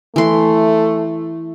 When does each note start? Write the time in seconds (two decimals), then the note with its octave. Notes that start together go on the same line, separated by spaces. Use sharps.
0.16 E3 A3 C6